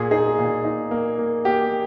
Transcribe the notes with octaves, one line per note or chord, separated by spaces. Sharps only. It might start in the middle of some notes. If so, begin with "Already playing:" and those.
Already playing: A#2 G#4
D#4 G#4
A#2
D#4
A#3
A#3
A#3 G4